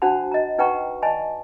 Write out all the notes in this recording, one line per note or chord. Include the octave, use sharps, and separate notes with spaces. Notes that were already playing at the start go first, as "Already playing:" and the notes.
D4 F#4 C5 F#5 A5 B5
D#5 A#5
D#4 B4 F#5 G5 A#5 C#6
D5 D#5 G#5 A5 B5